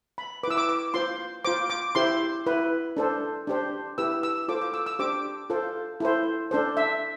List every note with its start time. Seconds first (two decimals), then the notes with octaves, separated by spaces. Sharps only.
0.18 B5
0.43 B4 D6
0.48 E4 E6
0.57 D6
0.69 D6
0.94 F4 C5 C6
1.45 F4 C5 D6
1.70 D6
1.95 E4 G4 C5 C6
2.47 E4 B4
2.97 D4 A4 C5
3.47 D4 G4 C5
3.98 E4 G4 B4 E6
4.23 E6
4.48 F4 A4 C5 D6
4.61 D6
4.74 E6
4.86 E6
4.99 D4 G4 C5 D6
5.50 F4 A4 C5
6.00 E4 A4 C5
6.51 D4 A4 C5
6.77 E5